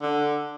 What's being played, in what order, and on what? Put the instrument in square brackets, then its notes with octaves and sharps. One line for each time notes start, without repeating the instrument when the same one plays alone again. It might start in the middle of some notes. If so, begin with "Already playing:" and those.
[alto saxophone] D3